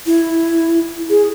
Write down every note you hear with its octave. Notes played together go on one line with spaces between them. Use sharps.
E4
G#4